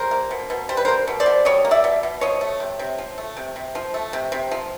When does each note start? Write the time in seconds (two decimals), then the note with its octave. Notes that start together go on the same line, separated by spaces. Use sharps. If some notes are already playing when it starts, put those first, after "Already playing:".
Already playing: G3 A#4 C5
0.11 A#3
0.31 B2
0.50 B2
0.69 G3 C5
0.77 B4
0.85 A#3 A#4 C5
1.08 B2
1.20 C5 D5
1.26 B2
1.45 G3 C#5 D#5
1.65 A#3
1.71 D5 E5
1.84 B2
2.03 B2
2.21 F3 C#5 D#5
2.41 A3
2.60 C3
2.79 C3
2.98 F3
3.18 A3
3.37 C3
3.56 C3
3.75 F3
3.94 A3
4.13 C3
4.32 C3
4.51 F3